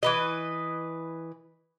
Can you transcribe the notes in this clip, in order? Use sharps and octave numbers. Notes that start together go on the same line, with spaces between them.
E3 B4 D#5